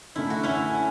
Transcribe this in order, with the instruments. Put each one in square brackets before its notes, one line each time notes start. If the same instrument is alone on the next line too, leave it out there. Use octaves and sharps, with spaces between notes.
[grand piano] F#2 D3 A3 [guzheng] E4
[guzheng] F#4
C#4 E4